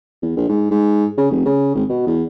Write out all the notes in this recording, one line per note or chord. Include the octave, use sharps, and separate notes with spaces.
E2
A#1
G#2
G#2
C#3
F1
C#3
G#1
B2
E2